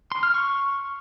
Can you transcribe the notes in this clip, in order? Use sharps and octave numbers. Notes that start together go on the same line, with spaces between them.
C6
F6
C#6